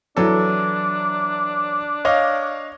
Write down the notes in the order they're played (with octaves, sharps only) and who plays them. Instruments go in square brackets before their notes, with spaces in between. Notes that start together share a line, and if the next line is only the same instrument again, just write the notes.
[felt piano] E3 F#3 A4 [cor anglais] D4
[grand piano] C#5 D#5 F5